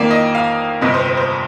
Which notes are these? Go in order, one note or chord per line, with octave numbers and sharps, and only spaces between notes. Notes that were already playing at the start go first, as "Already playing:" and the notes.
Already playing: F2 D#3 A#3 D5
D#5
F5
G1 F2 C3 D#5
C5
C5
C5